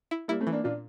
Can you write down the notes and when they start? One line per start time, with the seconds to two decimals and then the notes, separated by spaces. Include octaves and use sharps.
0.11 E4
0.28 G3 A#3 E4
0.41 A3 C4
0.47 E3
0.52 A#3 D4
0.64 A#2 D4 F4